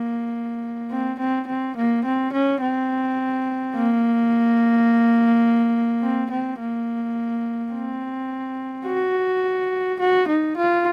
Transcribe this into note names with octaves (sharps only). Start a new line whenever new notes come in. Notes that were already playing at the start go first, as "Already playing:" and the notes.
Already playing: A#3
C4
C4
C4
A#3
C4
C#4
C4
A#3
C4
C4
A#3
C4
F#4
F#4
D#4
F4